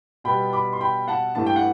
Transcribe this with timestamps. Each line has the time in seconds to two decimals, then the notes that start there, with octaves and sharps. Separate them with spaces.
0.24 B2 G3 B3 G5 B5
0.53 B5 D6
0.73 C6
0.80 G5 B5
1.08 F#5 A5
1.35 G2 E3 A3 A5
1.46 G5
1.56 F#5